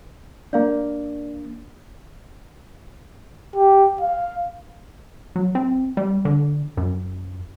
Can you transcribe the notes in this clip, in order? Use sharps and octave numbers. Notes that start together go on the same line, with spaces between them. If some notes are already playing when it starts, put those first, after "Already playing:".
A#3 D4 D5 F5
G4
F5
F#3
C4
G3
D3
F#2